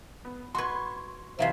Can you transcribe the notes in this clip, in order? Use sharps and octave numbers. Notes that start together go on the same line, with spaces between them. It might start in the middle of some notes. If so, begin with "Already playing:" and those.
B3
F#4 B4 C6 C#6 G#6
C3 E3 F#3 C5 E5 F5